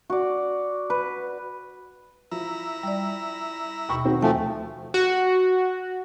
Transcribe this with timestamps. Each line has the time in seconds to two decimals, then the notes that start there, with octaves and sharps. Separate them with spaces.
0.10 F#4 D5
0.90 B4
2.31 F3 E4 A#5
2.83 G3 D5
3.89 D#2 B2 G5 B5 C#6
4.05 D#3 C4 F#4
4.23 F3 A3 G5 G#5
4.94 F#4